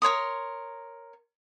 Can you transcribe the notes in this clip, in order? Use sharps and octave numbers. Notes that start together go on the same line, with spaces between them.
A#4 C#5 C6 D#6